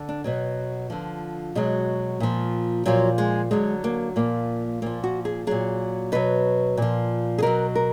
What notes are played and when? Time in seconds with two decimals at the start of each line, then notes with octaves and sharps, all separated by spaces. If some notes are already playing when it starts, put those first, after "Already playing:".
Already playing: D3
0.09 D4
0.24 B2 F#3 B3
0.90 D3 F3
1.55 B2 F#3 G#3
2.20 A#2 F3
2.86 A#2 F3 F#3
3.18 G#3
3.51 D3 F#3 G#3
3.84 A#3
4.16 A#2 F3 A#3
4.82 A#2 F3 A#3
5.04 F#4
5.25 G#4
5.47 A#2 F#3 G#4
6.12 B2 F#3 B4
6.77 A#2 F3
7.38 G#4
7.42 B2 F#3 A#4
7.75 A#4